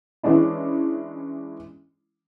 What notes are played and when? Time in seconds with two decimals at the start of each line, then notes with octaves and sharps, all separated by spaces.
0.23 E3 G#3 C#4 D4 E4